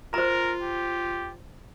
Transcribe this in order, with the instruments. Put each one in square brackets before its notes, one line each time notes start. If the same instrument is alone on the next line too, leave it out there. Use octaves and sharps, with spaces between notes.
[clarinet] F4 [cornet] A#4 [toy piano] C5 A#5
[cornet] G4